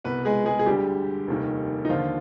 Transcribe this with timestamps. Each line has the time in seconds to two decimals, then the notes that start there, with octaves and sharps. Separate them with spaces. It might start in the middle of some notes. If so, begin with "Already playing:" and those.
0.04 C2 B2 B3 B4
0.25 G#3 G#4
0.45 G#3 G#4
0.59 G#4
0.66 D2 D3 G3 G4
1.28 F1 D#2 D#3
1.85 D#4
1.89 D#2 D3 F3 F4